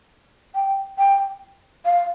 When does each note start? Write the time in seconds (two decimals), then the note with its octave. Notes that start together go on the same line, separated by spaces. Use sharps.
0.55 G5
0.98 G5
1.86 F5